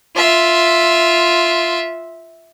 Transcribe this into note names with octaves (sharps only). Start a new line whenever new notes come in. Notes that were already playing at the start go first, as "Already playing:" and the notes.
F4 E5